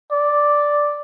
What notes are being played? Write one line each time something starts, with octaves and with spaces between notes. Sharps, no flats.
D5